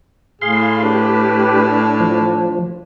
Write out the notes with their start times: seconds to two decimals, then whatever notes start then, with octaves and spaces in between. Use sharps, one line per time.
0.42 A2 G#4 F5 C6
0.83 D4 G4 B4
2.00 F3